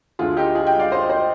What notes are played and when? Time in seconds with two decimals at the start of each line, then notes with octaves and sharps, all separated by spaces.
0.19 D2 D3 F4 G#4
0.37 D#4 G4
0.55 F4 G#4
0.67 D#5 G5
0.79 D5 F5
0.92 C5 D#5
1.09 C5 D#5